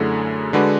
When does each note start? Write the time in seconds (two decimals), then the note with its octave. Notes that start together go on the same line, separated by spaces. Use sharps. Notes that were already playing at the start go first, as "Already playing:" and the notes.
Already playing: F#2 D3 A3 E4 G#4
0.53 D3 G#3 D4 F#4 B4